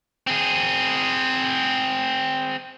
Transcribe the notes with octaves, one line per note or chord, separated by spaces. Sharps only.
C4 G#4